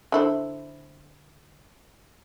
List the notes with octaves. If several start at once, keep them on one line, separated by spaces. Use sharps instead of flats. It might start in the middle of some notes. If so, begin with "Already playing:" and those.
D3 E4 C5